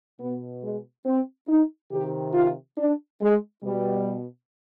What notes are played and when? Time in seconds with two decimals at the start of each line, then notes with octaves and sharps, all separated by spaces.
0.19 B2 B3
0.62 G#3
1.05 C4
1.48 D#4
1.91 C3 D#3 G4
2.34 F4
2.77 D4
3.21 G#3
3.63 B2 G3